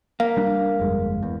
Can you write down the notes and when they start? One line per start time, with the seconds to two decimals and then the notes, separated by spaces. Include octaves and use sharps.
0.20 A#3 F5
0.37 G3 D4
0.80 G1 F2 G#3
1.23 E2